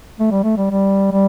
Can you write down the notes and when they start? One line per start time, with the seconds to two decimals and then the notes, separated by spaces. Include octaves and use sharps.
0.20 A3
0.31 G3
0.44 A3
0.57 G3
0.71 G3
1.12 G3